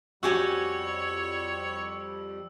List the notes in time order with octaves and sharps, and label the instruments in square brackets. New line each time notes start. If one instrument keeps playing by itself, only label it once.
[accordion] F2 G3 [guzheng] F#4 G4 G#5 [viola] C#5 [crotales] E6